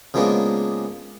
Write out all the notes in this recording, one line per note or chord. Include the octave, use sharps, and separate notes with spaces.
C#3 F3 G#3 A#3 B3 D4